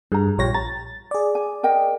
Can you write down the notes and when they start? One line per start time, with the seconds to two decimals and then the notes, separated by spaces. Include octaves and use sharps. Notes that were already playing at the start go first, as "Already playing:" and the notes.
0.12 G2 G#4 A#5
0.38 A#1 F4 G4 C#5 A#6
0.54 A#5 A6
1.11 G#4 D5
1.35 G#5
1.63 A#4 D#5 G5